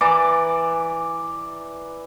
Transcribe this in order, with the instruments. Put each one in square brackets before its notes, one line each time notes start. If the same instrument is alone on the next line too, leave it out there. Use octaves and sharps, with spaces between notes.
[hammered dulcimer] E3 D5 A#5 D6